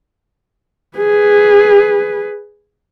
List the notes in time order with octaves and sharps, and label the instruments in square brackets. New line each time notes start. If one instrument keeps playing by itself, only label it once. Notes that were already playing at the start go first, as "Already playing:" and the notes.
[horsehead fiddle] G#4 B4